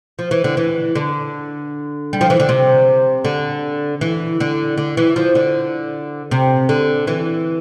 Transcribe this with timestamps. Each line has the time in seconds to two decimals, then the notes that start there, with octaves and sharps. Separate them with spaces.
0.19 F3
0.31 E3
0.44 D3
0.57 E3
0.95 D3
2.13 G3
2.21 F3
2.30 E3
2.40 D3
2.49 C3
3.25 D3
4.01 E3
4.40 D3
4.78 D3
4.97 E3
5.16 F3
5.35 D3
6.31 C3
6.69 D3
7.07 E3